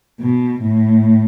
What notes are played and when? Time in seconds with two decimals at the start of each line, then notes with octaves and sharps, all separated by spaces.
0.20 B2
0.62 A2